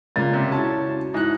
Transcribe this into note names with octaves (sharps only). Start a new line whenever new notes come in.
A#2 C#3 G#3 A6
C3
C#4 E4 F#4 A5
G#2 E4 F#6